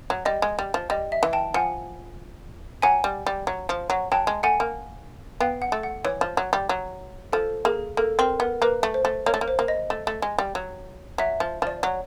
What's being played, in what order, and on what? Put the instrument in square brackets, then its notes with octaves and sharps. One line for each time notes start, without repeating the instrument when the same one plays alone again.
[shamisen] F#3
[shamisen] G3 [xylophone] D#5
[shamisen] G#3
G3
F3
[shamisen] G3 [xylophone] D#5
[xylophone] E5
[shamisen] E3
[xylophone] G5 A5
[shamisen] F3 [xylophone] F#5 G#5
[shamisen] F#3 [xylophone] F#5 G#5
[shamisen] G3
G3
F#3
F3
F#3
[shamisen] F#3 [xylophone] G5 A5
[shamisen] G#3
[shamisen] A3 [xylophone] F#5 G#5
[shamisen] A#3
[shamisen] B3 [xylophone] F5 G5
[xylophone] F#5
[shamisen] A3
[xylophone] F#5
[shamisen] E3 [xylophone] C#5
[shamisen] F3
F#3
G3
F#3
[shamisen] F3 [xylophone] A4
[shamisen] A#3 [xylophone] G#4
[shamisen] A#3 [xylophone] A4
[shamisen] C4 [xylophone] A#4
[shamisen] B3 [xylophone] A#4
[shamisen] A#3 [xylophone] B4
[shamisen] A3
[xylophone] C5
[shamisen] A3
[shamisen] A#3 [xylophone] C#5
[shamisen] A3
A#3
[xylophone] C5
[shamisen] A#3
[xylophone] D#5
[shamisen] A3
A3
G#3
G3
F#3
[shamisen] F#3 [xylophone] E5
[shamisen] F3
[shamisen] F3 [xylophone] D5
[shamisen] F#3 [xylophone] C#5